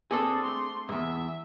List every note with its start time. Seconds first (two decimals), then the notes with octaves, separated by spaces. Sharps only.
0.11 C4 D4 G#4 A4
0.43 A3 C6
0.89 E2 G#2 E5